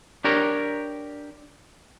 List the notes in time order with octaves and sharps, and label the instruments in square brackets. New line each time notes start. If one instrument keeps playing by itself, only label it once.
[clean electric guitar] D4 G4 A#4 C#5